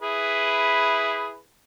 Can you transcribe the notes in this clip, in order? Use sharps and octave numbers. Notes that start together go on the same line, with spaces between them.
E4 G#4 B4